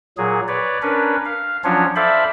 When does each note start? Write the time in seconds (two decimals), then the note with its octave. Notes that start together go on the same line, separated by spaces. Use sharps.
0.18 A#2 F#3 G#4
0.48 B4 C#5 D5
0.82 C#4 D4 A#4 B4
1.25 F5
1.64 F3 F#3 C#4 D4 F4 C#5
1.96 A4 C5 D5 E5 F5 B5